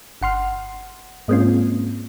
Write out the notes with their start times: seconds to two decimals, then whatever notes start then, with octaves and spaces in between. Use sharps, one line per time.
0.22 G1 F#5 C6 F6
1.28 G#2 G#3 A#3 C4 C#4 F4